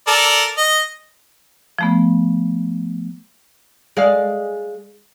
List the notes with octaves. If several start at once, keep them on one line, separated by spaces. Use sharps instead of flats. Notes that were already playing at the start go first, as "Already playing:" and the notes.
A4 A#4 D5
D#5
F3 A3 B3
G#3 D5 F5